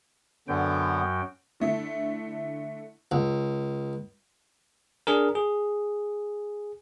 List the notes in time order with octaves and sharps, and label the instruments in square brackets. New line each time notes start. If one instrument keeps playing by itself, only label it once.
[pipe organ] F#2 F#3 G5 [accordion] D3 B3
[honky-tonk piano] D3 A3 E4
[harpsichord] C#2
[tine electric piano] D4 G#4 A#4
G#4